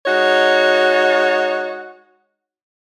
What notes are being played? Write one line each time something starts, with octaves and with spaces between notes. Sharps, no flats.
G#3 D#4 F#4 C#5